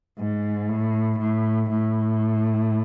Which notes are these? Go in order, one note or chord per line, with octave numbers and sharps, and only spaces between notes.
G#2
A2
A2
A2